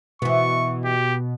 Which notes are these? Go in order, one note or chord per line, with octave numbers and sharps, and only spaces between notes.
B2 E3 B3 C#6
G4